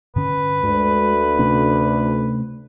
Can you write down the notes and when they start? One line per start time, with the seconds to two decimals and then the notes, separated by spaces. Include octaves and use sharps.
0.16 G2 D3 C#4 B4
0.63 D2 G#3
1.39 C3 A3 C#4